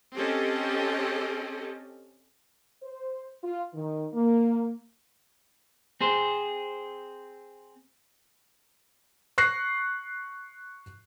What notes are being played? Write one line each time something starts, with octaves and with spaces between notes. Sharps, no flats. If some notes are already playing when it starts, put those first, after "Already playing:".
C4 C#4 G4 A4 D#5
C5
F4
D#3
A#3
C4 G#4 C5
C#6 F#6 A#6 C7